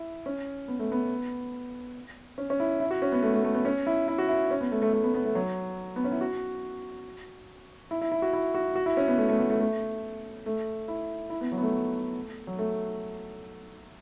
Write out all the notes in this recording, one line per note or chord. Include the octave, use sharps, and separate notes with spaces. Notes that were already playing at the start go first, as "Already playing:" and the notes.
Already playing: E4
C#4
B3
A3
B3
C#4
C#4
E4
E4
F#4
C#4
B3
A3
A3
A3
B3
C#4
E4
E4
F#4
E4
C#4
B3
A3
A3
A3
B3
B3
A3
F#3
B3
C#4
E4
F#4
E4
E4
E4
F#4
E4
F#4
F#4
E4
C#4
B3
A3
A3
B3
A3
A3
A3
E4
E4
B3
F#3
B3
A3
F#3
A3